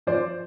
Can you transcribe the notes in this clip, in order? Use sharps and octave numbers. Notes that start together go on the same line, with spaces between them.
F3 C5 D5